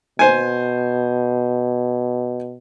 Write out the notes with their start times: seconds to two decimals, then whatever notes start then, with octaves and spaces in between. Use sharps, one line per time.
0.19 B2 C5 G#5